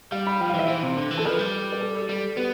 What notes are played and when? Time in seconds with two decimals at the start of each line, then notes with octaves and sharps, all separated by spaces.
0.12 G3 F5
0.27 B5
0.40 F3 G5
0.49 F5
0.54 E3 E5
0.68 E3 C5
0.83 C3
0.97 D3
1.11 E3
1.17 A4
1.25 F3 B4
1.39 G3
1.72 B4
1.81 A4
2.02 G4
2.09 G3 A4
2.37 B3 G4